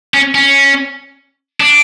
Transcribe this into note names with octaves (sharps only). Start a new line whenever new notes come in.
C#4
C#4
D4